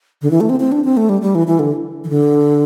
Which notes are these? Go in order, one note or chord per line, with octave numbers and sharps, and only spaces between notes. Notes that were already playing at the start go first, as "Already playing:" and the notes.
D3
E3
A3
C4
C4
D4
C4
A3
G3
G3
E3
E3
D3
E3
D3